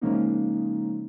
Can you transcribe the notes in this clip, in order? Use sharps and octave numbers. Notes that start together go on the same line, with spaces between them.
C#3 F3 G#3 A#3 C#4 D#4